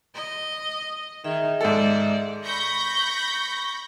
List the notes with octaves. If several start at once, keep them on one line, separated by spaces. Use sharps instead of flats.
D#5
D#3 G#4 D#5 E5
G#2 A4 D5
B5 C#6 G6 A#6